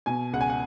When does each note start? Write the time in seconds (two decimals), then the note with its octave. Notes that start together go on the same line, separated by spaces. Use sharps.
0.06 B2 G#5
0.33 C#2 F#5
0.41 G#5
0.50 F#5